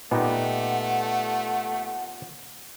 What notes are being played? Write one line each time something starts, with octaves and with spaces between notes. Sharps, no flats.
A#2 A3 B3 D#4 G4 F#5